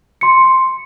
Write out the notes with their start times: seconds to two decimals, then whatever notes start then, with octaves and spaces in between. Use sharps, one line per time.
0.21 C6 C#7